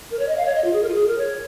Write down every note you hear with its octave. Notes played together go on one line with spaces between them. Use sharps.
A#4
C#5
D#5
F5
C#5
D#5
F4
G#4
A#4
F4
G#4
A#4
C#5